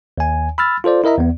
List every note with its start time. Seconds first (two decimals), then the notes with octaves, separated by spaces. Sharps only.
0.18 D#2 G#5
0.58 B5 E6 F6 A6
0.84 F4 A4 C5 D5
1.04 E4 A#4 D#5 E5 A#5
1.18 E2 B3